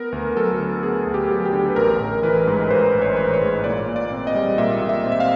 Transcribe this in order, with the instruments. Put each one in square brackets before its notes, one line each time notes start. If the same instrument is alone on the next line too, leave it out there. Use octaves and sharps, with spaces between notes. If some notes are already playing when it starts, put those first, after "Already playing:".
Already playing: [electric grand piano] B3 A#4
D2
F#3 A4
D3
B3 G#4
D2
G4
F#3
G4
D3
B4
A1 A#4
A1
E3 B4
G#2
B4
A1 C5
A1
C#5
C5
E3 B4
C5
C#5
G#2
A#2 D5
A#2
D5
C4
D#5
G3
A#2 E5
A#2
E5
C4
E5
F5